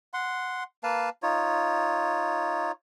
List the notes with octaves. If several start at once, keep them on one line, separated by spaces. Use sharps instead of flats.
F#5 C6
A#3 B4 F5 A5
D#4 F4 C#5